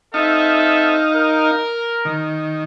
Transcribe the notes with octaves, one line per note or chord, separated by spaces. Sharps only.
C4 D#4 A4 E5 F5
A#4
D#3